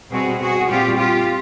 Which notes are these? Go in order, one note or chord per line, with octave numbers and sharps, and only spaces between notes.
B2 G3 C4 F#4 G#4
F#4 G#4
A#2 G3 C4 F4 G4
F4 G4